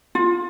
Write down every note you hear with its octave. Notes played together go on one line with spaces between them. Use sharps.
F4